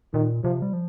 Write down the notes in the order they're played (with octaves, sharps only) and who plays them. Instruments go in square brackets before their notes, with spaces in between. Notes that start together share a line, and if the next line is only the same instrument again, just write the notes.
[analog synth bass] A#2 [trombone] D#3
[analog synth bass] C3 [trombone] F3
[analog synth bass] G3
F3